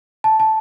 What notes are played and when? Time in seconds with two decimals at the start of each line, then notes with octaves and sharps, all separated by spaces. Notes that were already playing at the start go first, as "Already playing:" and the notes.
0.24 A5
0.40 A5